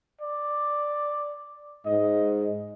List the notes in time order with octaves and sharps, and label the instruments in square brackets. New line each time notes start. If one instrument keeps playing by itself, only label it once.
[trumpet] D5
[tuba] G#2 [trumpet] D#5